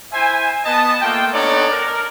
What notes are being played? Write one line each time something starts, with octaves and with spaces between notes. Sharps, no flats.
E4 C5 E5 G#5
B3 D#5 A5
A3 A#3 F4 G5
B3 D4 D#4 A4 C#5 D5
A#4